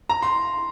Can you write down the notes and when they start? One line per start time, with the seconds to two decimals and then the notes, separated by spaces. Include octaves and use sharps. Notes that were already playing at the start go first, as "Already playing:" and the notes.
0.09 A#5
0.22 C6